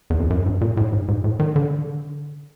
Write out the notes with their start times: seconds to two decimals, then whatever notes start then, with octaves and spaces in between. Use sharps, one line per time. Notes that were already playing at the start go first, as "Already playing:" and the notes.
0.10 E2
0.20 F2
0.30 F#2
0.46 G2
0.61 A#2
0.77 A2
0.93 G#2
1.08 G#2
1.24 A2
1.39 D#3
1.56 D3